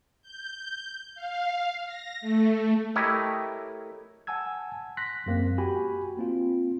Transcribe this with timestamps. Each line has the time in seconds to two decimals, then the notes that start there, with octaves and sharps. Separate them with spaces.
0.22 G6
1.15 F5
1.85 A#6
2.21 A3
2.96 A3 E4 G4 A#4 C#5 D#5
4.27 F#5 G#5 A5 E6 G#6
4.97 C6 F#6 A#6 B6
5.26 F#2 G#3 A#3 C4
5.58 F#4 G4 G5 G#5 B5
6.17 A#3 C4 F4